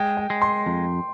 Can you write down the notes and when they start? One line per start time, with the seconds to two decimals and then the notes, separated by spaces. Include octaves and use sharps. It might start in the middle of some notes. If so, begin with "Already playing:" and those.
Already playing: G#3 G5
0.17 G5
0.30 G#3
0.42 C6
0.66 F2